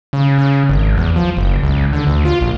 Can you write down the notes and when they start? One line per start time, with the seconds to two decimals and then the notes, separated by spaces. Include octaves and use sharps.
0.13 C#3
0.38 C#3
0.69 G#1
0.97 E2
1.16 F3
1.37 F#1
1.64 C#2
1.93 D3
2.07 D2
2.25 F4
2.41 A#1